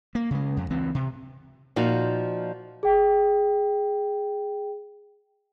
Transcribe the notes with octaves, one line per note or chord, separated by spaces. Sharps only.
A#3
C#3 G#3
F2
C#2 E3 C4
C3
A#2 F3 D#4 F4 F#4
G#4 G5